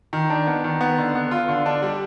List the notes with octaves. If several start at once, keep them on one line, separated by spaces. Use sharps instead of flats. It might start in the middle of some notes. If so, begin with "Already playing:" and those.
D#3
D4
B3
D#3
B3
D3
B3
F4
D3
D4
G3